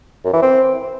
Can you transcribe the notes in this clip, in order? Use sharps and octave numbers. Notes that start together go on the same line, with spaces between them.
F#2
E3
C4